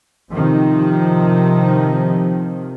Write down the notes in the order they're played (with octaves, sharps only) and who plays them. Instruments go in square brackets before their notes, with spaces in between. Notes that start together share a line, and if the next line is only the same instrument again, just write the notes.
[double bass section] C3 D#3 F3